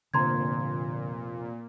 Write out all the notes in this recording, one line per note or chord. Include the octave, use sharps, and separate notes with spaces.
F1 A#2 D3 F3 A#5 C6 G#6